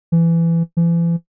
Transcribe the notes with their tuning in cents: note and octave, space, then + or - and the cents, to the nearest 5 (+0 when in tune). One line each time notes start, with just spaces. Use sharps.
E3 +20
E3 +40